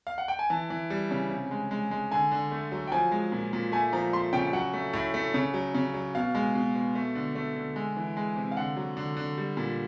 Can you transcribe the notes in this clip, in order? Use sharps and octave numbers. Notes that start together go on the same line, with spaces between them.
F5
F#5
G5
G#5
E3 A5
E3
G3
C#3
C3
G#3
G#3
G#3
D3 G#5
D3
A3
F#3
G5
F3 G#5
G#3
A#2
A#2
A3 G#5
F3 A#5
A3 C6
C#3 G5
F#3 F#5
A3
A2
A3
C#3
F#3
C#3
F#3
B2 F5
G#3
B2
B2
A3
D3
A3
D3
G#3
E3
G#3
C3
F5
D3 F#5
F#3
D3
D3
G3
A#2